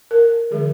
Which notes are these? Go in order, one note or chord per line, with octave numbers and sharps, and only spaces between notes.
A#4
D3 F3 G#3 G#4